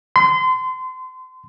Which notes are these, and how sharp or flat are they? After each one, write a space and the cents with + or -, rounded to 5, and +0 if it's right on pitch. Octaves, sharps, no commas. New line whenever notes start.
C6 -30